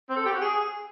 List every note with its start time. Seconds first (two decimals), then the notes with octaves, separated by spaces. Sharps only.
0.08 C4
0.16 A4
0.24 G4
0.32 F#4
0.40 G#4